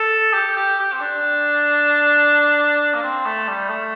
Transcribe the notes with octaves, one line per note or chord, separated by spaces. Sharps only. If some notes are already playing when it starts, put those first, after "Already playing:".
Already playing: A4
G4
G4
G4
C4
D4
A#3
C4
A3
G3
A3